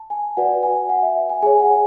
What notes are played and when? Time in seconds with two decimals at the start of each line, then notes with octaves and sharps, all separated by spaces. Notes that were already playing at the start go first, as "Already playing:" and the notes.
Already playing: A5
0.10 G#5
0.37 F#4 B4 D5 F#5
0.63 G#5
0.89 F#5
1.02 E5
1.29 G#5
1.42 G#4 C#5 G#5
1.60 F#5